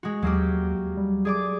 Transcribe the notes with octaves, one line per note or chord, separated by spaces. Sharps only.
G#3 F#4
D#2 F#3 A#3 G4
G3
G#4 D5 D6